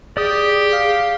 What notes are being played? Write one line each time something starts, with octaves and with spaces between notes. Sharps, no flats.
G4 G#4 D5 D#6
F5